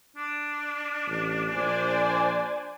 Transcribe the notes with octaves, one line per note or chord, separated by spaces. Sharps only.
D4
A1
A#1 C5 D5 G#5